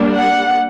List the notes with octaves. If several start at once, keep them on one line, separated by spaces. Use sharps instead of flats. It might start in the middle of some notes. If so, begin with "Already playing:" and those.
Already playing: G3 A#3 D4
F#5